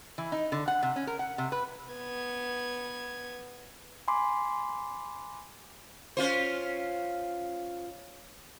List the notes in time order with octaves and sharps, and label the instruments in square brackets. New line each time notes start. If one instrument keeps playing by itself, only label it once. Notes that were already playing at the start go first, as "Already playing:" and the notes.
[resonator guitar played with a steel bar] E3
D#4
D3
F#5
C3
C#4
A#4
F#5
C3
B4
[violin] B3 G#6
[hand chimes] G#5 B5 C6 D6
[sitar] C#4 F4 C5